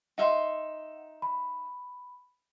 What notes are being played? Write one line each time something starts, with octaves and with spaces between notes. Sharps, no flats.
D#4 E5 F#5 C6
B5